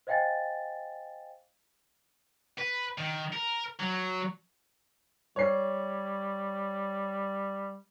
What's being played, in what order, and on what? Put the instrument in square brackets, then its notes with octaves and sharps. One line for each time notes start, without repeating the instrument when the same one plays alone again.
[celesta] C5 D#5 F5 G5 G#5 A6
[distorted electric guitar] B4
D#3
A#4
F#3
[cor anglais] G3 [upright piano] C#5 C7